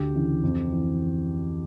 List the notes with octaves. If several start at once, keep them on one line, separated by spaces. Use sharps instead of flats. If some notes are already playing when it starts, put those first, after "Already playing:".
Already playing: D2 G4
C#3 E3
F2
E3